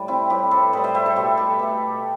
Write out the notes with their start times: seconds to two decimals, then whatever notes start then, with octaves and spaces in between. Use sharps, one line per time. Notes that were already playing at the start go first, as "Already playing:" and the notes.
Already playing: A2 G3
0.08 C4 E4
0.30 A2 G3 G4 B4
0.51 A4 C5
0.73 A2 G3 B4 D#5
0.84 C5 E5
0.94 C5 E5
1.06 A4 C5
1.16 B2 A3 G4 B4
1.37 G4 B4
1.59 B2 A3